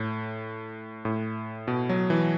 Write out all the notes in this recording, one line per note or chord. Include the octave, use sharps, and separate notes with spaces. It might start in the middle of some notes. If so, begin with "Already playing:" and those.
Already playing: A2
A2
B2
F#3
E3